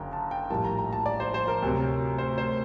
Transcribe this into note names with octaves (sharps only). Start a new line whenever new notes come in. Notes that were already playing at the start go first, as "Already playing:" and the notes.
Already playing: F#1 F#2 D3 G5 A#5
A5
G5
A#1 A2 G3 A#3 A5
A#5
A#5
A5
D5
C5
C5
A#4
D2 C3 F#3
C5
C5